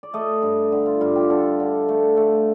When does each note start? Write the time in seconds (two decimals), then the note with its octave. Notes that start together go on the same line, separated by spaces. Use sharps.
0.03 D5
0.14 A3 D#5
0.42 G2
0.72 D3
0.86 F4
1.01 G2 F4
1.16 G4
1.30 D3 A4
1.60 D3
1.89 A3
2.17 A3